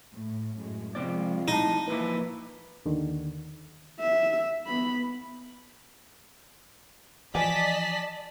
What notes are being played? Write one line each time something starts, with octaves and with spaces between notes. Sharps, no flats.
A2
F#2 A2 G#3
C3 F3 G#3 C4 F4 D5
D#4 E4 A5
F3 A#3 E4 F4 B4
D#2 D3 D#3
E5
B3 B5
E3 F3 D5 D#5 G#5 A5 B6